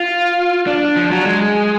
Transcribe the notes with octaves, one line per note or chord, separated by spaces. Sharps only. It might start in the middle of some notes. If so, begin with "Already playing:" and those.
Already playing: F4
D4
F3
F#3
G#3